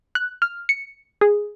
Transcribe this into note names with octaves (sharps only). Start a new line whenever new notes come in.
F#6
F6
C#7
G#4